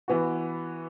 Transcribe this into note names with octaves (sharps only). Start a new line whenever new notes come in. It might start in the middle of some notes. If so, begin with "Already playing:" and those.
E3 B3 F#4